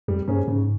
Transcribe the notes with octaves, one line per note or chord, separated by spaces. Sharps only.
F2 G3
G2 A#3 C#4 G#4 C5
G#2 C#3